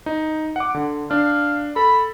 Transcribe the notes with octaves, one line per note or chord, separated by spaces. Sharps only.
D#4
F#5 D6
D3
D4 F5
A4 B5